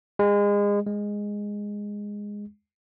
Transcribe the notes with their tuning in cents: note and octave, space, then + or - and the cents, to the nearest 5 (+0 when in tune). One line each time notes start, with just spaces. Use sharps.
G#3 -30
G#3 -10